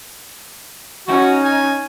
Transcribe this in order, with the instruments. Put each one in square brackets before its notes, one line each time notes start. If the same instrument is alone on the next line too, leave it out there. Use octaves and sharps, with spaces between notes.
[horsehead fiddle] C#4 D#4 [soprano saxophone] F#4
[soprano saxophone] G#5